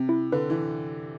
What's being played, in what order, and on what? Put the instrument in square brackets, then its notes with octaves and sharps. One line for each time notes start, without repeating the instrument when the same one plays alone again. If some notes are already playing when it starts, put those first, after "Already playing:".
Already playing: [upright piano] C3 [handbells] C4
[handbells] E4
[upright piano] D3 [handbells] B4
[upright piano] E3